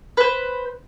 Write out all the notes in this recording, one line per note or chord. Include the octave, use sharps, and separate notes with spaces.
B4 C5